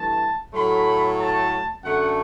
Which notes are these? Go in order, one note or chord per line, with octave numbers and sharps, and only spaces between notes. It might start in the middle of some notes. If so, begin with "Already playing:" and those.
Already playing: G2 E3 A3 A5
A2 F#3 A3 B5
A5
F#2 D3 A3 F#5